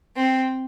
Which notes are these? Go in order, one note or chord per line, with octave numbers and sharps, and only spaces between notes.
C4